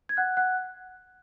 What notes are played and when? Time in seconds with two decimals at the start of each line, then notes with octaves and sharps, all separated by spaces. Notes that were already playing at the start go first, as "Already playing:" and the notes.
0.09 G#6
0.17 F#5 F#6
0.37 F#5 F#6